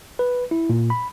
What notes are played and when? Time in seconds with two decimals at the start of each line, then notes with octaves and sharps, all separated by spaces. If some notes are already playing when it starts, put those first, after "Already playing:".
0.19 B4
0.51 E4
0.70 A#2
0.90 B5